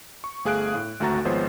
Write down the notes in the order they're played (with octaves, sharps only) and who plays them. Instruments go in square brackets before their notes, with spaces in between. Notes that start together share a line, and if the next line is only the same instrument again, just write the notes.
[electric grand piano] C#6
G1 A3 G#4 F5 F#6 D7
A2
G#1 D2 A3 F#4 A#5 A6
G#1 F3 G#3 B3 C5 C#5